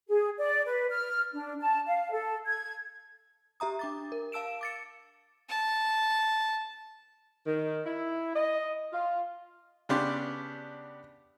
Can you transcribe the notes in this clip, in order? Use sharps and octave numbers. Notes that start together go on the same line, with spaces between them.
G#4
D5
B4
F6
D4
A5
F5
A4
G#6
G4 E5 A#5 D#6
D4 D6 A6
A#4
F5 A5 E6 D7 E7
D6 A6 C#7
A5
D#3
E4
D#5
F4
C#3 B3 D4 G4 C6